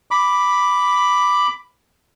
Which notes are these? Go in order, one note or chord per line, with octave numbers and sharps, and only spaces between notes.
B5 D6